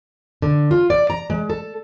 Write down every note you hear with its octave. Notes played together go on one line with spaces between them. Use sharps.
D3
F4
D5
A#5
G#3
A4